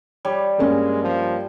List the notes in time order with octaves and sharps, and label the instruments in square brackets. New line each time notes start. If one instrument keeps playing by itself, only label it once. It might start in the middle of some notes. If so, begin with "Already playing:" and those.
[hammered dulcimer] G3 [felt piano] C#5
[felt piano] G2 A#3 C#4 [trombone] G#3
[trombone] F3